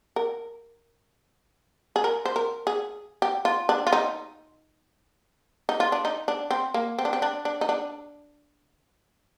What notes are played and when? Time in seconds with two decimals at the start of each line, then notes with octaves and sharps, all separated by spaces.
0.16 A#4
1.96 G#4
2.04 A#4
2.25 C5
2.36 A#4
2.67 G#4
3.22 G4
3.45 F4
3.69 D4
3.87 F4
3.93 D#4
5.69 D#4
5.80 F4
5.92 D4
6.05 D#4
6.28 D4
6.51 C4
6.74 A#3
6.99 C4
7.05 D4
7.13 C4
7.22 D4
7.45 D4
7.61 D#4
7.69 D4